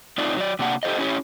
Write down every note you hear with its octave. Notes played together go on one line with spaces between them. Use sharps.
A3 C4 D#4 F4 D5
F#3 D5
C3 A#3 D4 F#5
G4 A4 C5 D#5
C#4 E4 G4 C5 C#5